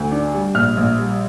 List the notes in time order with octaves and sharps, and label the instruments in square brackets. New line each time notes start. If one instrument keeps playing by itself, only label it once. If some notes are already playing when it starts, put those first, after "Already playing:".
Already playing: [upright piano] D2
D4
G3
A#1 F6
A#1
G3